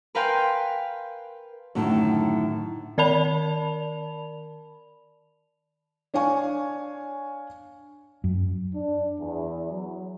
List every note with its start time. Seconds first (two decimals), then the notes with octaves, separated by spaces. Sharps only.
0.15 A#4 B4 F5 G5 G#5 C6
1.75 F#2 A2 D3 D#3
2.98 D#3 A#4 D5 A5 B5 F7
6.14 D4 C#5 F5 G#5 C#6
8.24 F#2
8.75 D4
9.20 E2
9.71 F#3